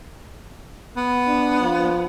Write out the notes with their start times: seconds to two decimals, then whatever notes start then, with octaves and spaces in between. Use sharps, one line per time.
0.97 B3
1.27 D4
1.61 F3